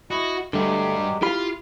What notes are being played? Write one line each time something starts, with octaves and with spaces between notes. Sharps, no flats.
E4 F#4 D#5
G2 D3 F#3 G#3 A3 G4
E4 F4 G4 F5 B5